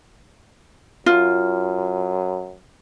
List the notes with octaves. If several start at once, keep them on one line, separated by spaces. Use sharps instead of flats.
F#2 F4